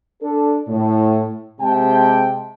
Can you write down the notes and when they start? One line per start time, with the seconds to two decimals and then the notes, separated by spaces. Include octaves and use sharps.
0.22 D4 A4
0.68 A2
1.60 C3 G#3 G5 A5